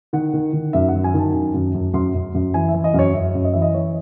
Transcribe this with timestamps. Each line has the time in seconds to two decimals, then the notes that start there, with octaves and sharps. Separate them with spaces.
0.13 D#3 F#5
0.33 D#3
0.53 D#3
0.73 F#2 E5
0.88 F#5
0.94 F#3
1.04 G#5
1.14 D#3 A5
1.33 F#2
1.54 F#2
1.74 F#2
1.94 F#2 C6
2.15 F#2
2.34 F#2
2.54 E3 G#5
2.69 E5
2.74 E3
2.84 D#5
2.94 F#2 C#5
3.14 F#2 E5
3.35 F#2
3.44 D#5
3.53 E3 E5
3.62 D#5
3.74 E3 C#5